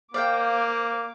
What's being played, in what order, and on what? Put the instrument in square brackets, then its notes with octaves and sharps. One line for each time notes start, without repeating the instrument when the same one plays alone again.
[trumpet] A#3 [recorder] C5 [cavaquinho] D5 F5 G5 [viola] D6